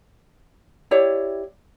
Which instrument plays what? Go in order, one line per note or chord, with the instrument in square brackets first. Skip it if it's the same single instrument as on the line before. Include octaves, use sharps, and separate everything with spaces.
[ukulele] E4 G4 C#5 D5